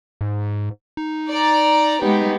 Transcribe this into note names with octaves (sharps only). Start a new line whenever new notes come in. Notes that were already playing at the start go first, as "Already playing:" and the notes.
G#2
D#4
D5 A#5
G#3 B3 D#4 G4